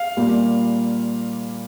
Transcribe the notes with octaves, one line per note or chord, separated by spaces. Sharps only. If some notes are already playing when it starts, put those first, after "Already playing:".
Already playing: F5
A#2 G3 A#3